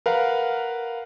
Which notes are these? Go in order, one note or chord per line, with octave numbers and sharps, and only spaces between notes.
A#4 B4 F5 F#5